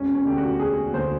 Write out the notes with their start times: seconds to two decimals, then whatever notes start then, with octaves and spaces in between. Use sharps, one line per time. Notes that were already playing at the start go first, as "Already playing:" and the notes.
Already playing: E1 C#4
0.15 C#4
0.25 D2 D3 G4
0.38 F#4
0.59 E1 G#4
0.93 D2 D3 C5